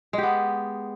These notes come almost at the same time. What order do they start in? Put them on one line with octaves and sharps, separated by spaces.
G#3 G4 B3